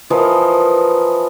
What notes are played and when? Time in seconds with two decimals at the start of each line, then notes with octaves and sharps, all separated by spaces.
0.10 E3 F3 A#4 D#5